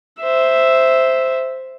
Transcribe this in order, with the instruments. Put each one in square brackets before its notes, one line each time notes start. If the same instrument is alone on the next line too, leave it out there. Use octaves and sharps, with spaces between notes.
[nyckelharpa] C5 E5